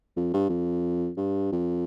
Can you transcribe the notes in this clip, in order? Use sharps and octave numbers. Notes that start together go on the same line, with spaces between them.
F2
G2
F2
G2
F2